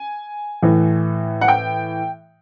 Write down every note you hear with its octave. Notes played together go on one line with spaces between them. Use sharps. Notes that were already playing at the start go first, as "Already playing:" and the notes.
Already playing: G#5
A2 E3
F#5
G5